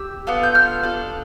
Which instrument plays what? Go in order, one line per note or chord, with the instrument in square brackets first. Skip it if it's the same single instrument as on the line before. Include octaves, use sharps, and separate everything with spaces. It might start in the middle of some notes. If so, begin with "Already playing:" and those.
Already playing: [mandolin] G4 E6
B3 D4 F4 A4
G6
F6
D4 A4